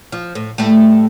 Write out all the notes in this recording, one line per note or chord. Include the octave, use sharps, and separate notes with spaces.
F3
A2
A2 G3 A3